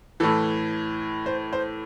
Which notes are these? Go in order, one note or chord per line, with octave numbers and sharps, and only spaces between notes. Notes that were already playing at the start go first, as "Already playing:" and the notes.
A2 E3 A4
C5
C5